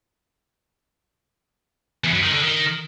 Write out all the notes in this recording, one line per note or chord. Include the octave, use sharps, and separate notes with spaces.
E2
F#2
D#3
D3
D#3